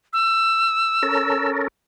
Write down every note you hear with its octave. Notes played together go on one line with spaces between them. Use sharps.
E6
C#4 A4 A#4